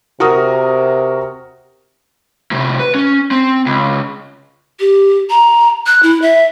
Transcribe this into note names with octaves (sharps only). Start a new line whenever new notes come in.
C3 F#4 A#4 D#6
A2 C3
B4
C#4
C4
C#2
G4
A#5
F#6
E4
E5